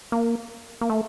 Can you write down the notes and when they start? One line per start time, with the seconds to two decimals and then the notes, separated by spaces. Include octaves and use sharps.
0.12 A#3
0.81 A#3
0.90 A3